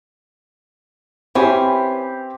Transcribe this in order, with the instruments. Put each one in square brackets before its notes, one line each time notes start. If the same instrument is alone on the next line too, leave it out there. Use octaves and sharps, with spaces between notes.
[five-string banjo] E3 C#4 [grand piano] C4 G4